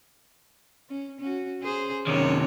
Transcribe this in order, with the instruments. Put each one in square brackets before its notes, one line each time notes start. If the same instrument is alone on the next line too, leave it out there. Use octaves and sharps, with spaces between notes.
[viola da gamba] C#4
C#4 F#4
C#4 G#4 C5
[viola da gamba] F#2 C#4 C#5 [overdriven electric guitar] C3 D#3